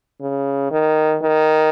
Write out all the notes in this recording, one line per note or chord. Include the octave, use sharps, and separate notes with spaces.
C#3
D#3
D#3